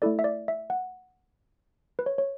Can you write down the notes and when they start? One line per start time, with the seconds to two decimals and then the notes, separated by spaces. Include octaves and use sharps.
0.02 A3 E4 A4 D5
0.19 E5
0.24 D5
0.48 E5
0.70 F#5
1.99 B4
2.06 C#5
2.18 C#5